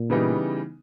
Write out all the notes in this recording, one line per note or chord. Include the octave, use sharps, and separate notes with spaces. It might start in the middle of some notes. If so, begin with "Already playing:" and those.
Already playing: A#2
C#3 E3 G3 B3 D#4